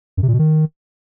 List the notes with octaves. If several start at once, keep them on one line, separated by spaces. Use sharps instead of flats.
F#2
C3
A#2
B2
D#3